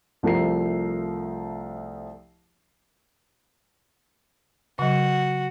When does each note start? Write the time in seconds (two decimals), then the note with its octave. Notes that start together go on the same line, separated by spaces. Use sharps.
0.23 C2 F3 A3 A#5 C7
4.79 C#3 F#3 F#4